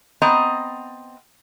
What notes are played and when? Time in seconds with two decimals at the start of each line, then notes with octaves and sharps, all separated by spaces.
0.22 B3 C4 D#5 A#5